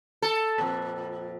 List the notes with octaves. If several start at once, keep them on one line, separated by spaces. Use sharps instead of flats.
A4
F2 A#2